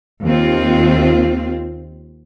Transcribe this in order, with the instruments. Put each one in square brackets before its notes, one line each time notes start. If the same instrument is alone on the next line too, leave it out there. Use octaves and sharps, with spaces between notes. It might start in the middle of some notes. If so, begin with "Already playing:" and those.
[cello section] D#2 C4 F4